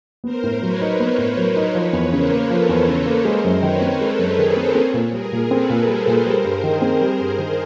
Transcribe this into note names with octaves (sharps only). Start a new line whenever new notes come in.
B3 A#4 C5
A2
F#3 B4 C#5
D#4
B3 A#4 C5
A2
F#3 B4 C#5
D#4
F3 B4 C#5
E2
C#3 A#4 C5
A#3
F3 A4 B4
E2
C#3
A#3
G#3 A#4 C5
F#2
D#3 B4 C#5
C4
G#3 A4 B4
F#2
D#3 G#4 A#4
C4
C4
A#2
G3 G#4 A#4
A#2
C4 A4 B4
A#2
G3 A#4 C5
A#2
G3 A#4 C5
G2
D#3 G#4 A#4
C4
G3 A#4 C5
G2
D#3